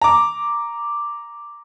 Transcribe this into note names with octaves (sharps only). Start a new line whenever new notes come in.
A#5 D6